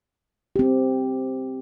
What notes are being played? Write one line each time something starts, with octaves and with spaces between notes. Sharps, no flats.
C4 G4